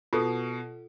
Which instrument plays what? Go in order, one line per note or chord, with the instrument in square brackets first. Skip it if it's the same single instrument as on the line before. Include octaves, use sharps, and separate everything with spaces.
[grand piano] B2 [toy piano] F4 A4